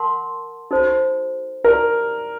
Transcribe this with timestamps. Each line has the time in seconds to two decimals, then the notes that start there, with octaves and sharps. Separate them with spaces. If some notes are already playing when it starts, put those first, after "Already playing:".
Already playing: A#4 F#5 A5 C6
0.71 D#4 F#4 A4 C5
1.64 D#4 G4 A#4 D5